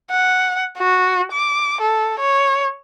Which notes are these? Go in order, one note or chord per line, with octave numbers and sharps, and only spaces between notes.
F#5
F#4
D6
A4
C#5